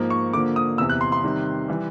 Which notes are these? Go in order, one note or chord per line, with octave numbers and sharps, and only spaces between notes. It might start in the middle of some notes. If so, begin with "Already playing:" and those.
Already playing: G#2 F3 A#3
C#6
D3 F3 A#3 D6
D#6
E2 C3 E3 E6
F#6
C6
C6
C3 D#3 G3
E3 G3